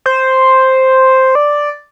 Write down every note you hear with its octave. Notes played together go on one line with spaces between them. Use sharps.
C5
D5